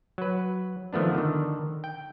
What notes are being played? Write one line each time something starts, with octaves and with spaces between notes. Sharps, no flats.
F#3 B4
D#3 F3 A3 B3 D4
D3 D#3
G5